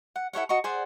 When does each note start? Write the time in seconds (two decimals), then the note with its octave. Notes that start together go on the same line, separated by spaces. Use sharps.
0.16 F#5
0.33 E4 A4 C#5 F#5
0.49 F#4 D#5 A#5 C#6
0.64 G#4 C5 D5 F#5